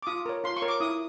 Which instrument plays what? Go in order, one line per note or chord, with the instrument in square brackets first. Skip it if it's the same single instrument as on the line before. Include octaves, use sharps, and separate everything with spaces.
[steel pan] D6
F4 D#6
A#4 C#5
F4 C6
C#6
A#4 C#5
D6
E4 D#6